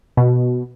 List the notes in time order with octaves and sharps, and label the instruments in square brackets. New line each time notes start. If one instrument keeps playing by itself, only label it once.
[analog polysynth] B2